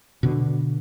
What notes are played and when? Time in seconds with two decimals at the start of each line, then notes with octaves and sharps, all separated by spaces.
0.23 B2 D3